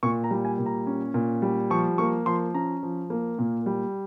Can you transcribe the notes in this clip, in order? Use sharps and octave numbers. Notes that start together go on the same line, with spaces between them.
A#2 C#6
A#5
G3
G#5
A#2
A#5
C#4
A#2
G3
F3 C#6
A#3 C#6
F3 C6
C#4 A#5
F3
A#3
A#2
G3